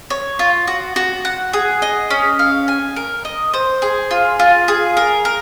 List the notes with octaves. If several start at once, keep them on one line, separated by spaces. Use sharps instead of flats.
C#5
F4
F#4
F#4
F#5
G#4
D#5
C#4
F5
G#5
A#4
D#5
C5
G#4
F4
F4
G#4
A#4
A#4